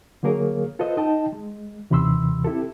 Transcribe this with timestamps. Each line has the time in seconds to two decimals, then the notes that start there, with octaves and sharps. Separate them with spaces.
0.23 D3 F#3 A#3 G#4 A#4 C#5
0.79 F4 A4 B4 C5 D#5
0.97 D#4 D#5 G5 A5
1.32 G#3
1.90 D#2 C3 E3 B5 C6 E6
2.44 C4 E4 G4 A4